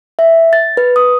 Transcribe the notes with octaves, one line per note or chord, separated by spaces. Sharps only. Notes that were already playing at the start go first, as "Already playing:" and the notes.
E5
A6
B4
D#6